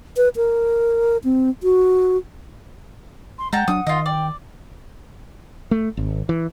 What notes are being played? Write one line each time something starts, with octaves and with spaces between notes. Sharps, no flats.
B4
A#4
C4
F#4
C6
G#3 F#5 G5 A5 A#5
F#3 D4 D#6
D#3 F4 D#5
D5 G5
A3
G#1
E3